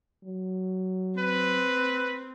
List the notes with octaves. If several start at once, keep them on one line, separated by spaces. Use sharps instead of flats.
F#3
C4 B4